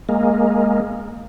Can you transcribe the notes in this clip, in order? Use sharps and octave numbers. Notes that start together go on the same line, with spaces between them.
G#3 A#3